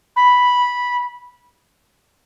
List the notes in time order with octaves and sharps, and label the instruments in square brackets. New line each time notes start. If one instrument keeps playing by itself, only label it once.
[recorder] B5